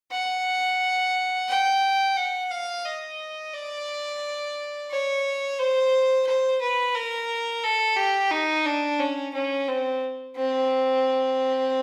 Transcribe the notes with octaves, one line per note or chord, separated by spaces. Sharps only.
F#5
G5
F#5
F5
D#5
D5
C#5
C5
C5
B4
A#4
A4
G4
D#4
D4
C#4
C#4
C4
C4